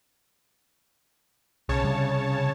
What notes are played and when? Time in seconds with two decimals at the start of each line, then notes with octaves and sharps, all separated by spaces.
1.69 B1 C#3 C#5 A5
1.84 C3 G3